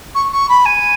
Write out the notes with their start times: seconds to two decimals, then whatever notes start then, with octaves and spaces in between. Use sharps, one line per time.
0.14 C#6
0.31 C#6
0.48 B5
0.65 G#5